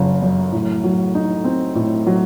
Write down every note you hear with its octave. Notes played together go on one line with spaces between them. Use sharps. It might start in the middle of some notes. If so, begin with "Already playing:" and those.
Already playing: F#1 C#3
F#2
A2
F#3
D#4
C4
A2
F#3